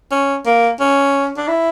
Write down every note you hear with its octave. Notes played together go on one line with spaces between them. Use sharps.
C#4
A#3
C#4
D4
E4